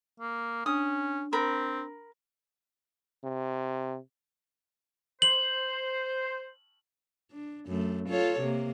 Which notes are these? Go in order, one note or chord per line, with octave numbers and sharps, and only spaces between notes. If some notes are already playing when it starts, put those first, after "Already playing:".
A#3
C#4 D4 D#6
C4 A#4 B5
C3
C5 F#7
D4
F#2 A3
F4 A4 C#5
C3 A#3